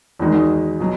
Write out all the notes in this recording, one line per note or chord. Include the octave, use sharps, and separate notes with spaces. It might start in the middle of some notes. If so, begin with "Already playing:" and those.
E2 D#3 G#3 D#4 F#4
B2 F#3